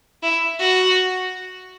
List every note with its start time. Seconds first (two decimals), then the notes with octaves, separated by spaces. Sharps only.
0.23 E4
0.59 F#4